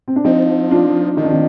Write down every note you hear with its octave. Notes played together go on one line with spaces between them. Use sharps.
C4
D4
F3 C4 D#4
D4 F4
D#3 D#4
D4
C4 D#4